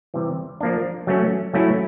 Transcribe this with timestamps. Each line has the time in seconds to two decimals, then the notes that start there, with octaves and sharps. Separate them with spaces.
0.14 C3 E3 G3
0.60 F3 A#3 D4
1.07 F#3 A3 C#4
1.53 F#3 A3 C#4 E4